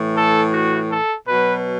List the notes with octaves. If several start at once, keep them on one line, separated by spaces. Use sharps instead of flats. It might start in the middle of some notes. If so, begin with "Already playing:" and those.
Already playing: A2 E3
A4
F#4
A4
B2 F#3 B4